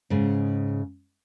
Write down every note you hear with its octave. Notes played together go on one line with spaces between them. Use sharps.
G#2 C#3